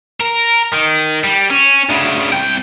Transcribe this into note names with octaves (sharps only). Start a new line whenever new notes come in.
A#4
D#3
G3
C#4
D2 C#3
C2 G5